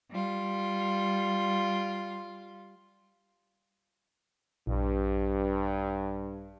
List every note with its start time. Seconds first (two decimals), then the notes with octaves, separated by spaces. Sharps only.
0.10 G3 F4
4.67 A#1 G2